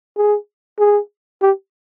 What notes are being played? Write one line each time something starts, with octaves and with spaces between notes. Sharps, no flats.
G#4
G#4
G4